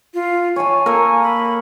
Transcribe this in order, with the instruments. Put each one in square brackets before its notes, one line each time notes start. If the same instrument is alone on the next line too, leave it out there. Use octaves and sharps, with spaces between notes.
[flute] F4
[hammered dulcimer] C#5 A5 [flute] G#5
[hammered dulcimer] A#3 A4 A#4
[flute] B5